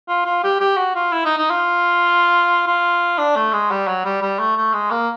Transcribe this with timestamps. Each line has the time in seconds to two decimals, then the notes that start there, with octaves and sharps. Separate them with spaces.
0.09 F4
0.26 F4
0.44 G4
0.60 G4
0.77 F#4
0.95 F4
1.12 E4
1.25 D#4
1.38 D#4
1.51 F4
2.67 F4
3.18 D4
3.36 A3
3.53 G#3
3.71 G3
3.87 F#3
4.05 G3
4.22 G3
4.39 A3
4.57 A3
4.74 G#3
4.91 A#3